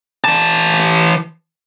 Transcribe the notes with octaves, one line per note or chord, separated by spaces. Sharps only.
E3 A5